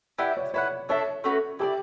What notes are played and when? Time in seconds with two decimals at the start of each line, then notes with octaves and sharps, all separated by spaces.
0.18 E4 G4 B4 D5 F#5
0.37 C#5
0.54 E4 B4 C#5 F#5
0.89 A3 D4 A4 C#5 E5
1.24 A3 C#4 F#4 B4
1.59 E4 G4 A4 D5